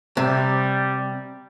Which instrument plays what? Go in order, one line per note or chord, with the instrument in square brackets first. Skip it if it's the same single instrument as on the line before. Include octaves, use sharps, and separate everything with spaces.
[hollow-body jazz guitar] C3 [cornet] G3